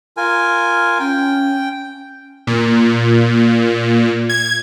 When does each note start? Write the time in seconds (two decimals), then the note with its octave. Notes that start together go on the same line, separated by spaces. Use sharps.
0.17 F4 A#4 G#5
1.00 C#4 G5
2.47 A#2
4.29 G#6